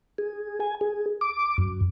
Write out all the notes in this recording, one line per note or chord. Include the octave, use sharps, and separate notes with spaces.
G#4
G#5
G#4
D6
F#2